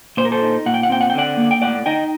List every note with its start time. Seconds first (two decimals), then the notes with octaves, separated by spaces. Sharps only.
0.17 A#2 C5
0.25 A#4
0.32 A4 C5
0.42 D#4
0.66 A#2 F#5
0.74 G5
0.83 F#5
0.90 C4 G5
1.01 F#5
1.10 G5
1.14 D3 D5 F#5
1.37 A#3
1.51 G5
1.62 A2 D5 F#5
1.86 D#4 D#5 G5